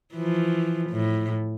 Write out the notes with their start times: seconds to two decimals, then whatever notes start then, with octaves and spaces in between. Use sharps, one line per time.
0.14 E3 F3
0.90 A2